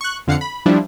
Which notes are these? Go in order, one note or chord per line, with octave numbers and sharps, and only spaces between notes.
C#6 F#6
F2 D3 F5 F#5 C7 C#7
B5
F3 G3 D4 E4